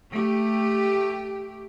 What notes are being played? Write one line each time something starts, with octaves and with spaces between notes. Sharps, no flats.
A3 G4